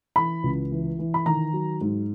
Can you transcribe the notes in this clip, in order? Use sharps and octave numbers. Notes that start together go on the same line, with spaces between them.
E3 B5
C#2
E3
E3
B5
D#3 A#5
F#3
G#2